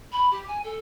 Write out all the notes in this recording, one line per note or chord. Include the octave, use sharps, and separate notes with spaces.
B5
G4
G#5
A4